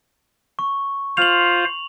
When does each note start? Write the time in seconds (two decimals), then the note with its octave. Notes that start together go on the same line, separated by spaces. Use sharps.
0.59 C#6
1.17 F4 C5 F5 F7 F#7